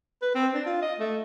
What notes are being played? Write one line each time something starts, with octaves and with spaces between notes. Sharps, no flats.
B4
C4
D4
F4
D#5
A3